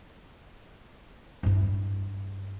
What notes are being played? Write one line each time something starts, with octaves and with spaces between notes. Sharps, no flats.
G2 E4